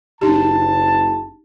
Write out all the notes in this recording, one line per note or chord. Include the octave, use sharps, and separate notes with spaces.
F#1 D4 D#4 G4 A5